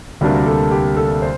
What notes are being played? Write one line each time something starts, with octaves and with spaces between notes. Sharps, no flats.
D2 C3 G3 A#3 D4 F#4
A#4
A4
G4
A4
C5